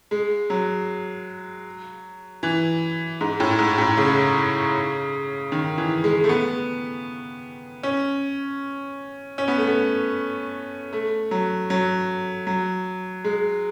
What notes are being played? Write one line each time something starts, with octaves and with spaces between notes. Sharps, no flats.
G#3
F#3
E3
G#2
A2
G#2
A2
C#3
D#3
E3
G#3
A3
B3
C#4
C#4
B3
A3
B3
A3
F#3
F#3
F#3
G#3